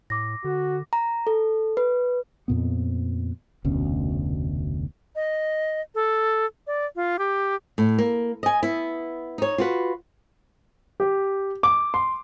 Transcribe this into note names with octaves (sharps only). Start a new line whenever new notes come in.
A2 D6 A#6
D3 F#4
A#5
A4
B4
F2 A#2 B3
F1 D2 B2 C#4
D#5
A4
D5
F4
G4
A2
A#3
D#5 G#5
B3 E4
D#4 C#5
F4 F#4 B4
G4
D6
C6